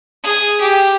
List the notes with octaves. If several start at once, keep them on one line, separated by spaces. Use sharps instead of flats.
G#4
G4